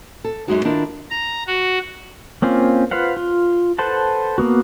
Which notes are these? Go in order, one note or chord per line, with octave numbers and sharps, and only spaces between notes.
A4
F#2 C#3 G#3 D#4 F#4 C#5
D#3 D4 E4 F4 A#4
A#5
F#4
A#3 C4 C#4 F4
F4 B4 C5 F5 F#5
F4
A4 B4 C5 F#5 A5
A#3 B3 F#4